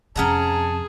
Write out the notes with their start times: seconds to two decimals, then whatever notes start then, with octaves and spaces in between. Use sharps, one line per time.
0.16 F2 C3 C#4 G#4 F#5 A5 A#5